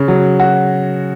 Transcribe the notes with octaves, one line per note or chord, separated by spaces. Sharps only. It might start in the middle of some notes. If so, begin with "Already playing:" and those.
Already playing: C#3
F#3
F#4